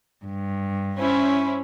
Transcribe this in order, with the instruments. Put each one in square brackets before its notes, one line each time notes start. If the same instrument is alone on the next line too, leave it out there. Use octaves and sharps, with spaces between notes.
[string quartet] G2
[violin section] C#4 E4 C5